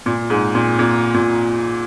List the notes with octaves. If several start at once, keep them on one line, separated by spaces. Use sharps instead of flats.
A#2
G#2
A#2
A#2
A#2